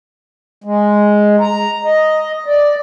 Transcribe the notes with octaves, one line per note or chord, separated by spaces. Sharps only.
G#3
A#5
D#5
D5